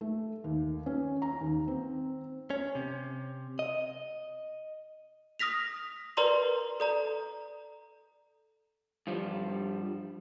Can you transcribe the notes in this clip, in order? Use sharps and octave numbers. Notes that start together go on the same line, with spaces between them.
A3
D#2
C#4
A#5
D#2
C4
C#4
C3
D#5
D#6 F6 A#6 B6 F7
A#4 B4 D5 A#5 C6 F#7
A4 D5 A#5
G2 F3 G3